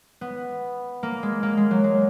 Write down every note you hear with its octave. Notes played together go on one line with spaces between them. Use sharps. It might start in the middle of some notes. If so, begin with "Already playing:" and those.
B3
A#3
G#3
A#3
G#3
F#3
G#3